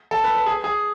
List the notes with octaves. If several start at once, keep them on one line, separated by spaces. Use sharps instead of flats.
A4
B4
B4
G#4
G#4